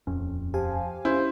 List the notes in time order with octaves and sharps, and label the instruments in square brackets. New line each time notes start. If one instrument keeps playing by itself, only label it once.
[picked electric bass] D#1 F2 C#4
[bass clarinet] F3 [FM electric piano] G4 F5 G#5
[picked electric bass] C#4 [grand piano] E4 [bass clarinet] C5